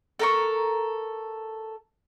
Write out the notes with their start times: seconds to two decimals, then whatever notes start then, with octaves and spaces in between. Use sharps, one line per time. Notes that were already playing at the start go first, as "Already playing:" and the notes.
0.19 A4 A#4 C#6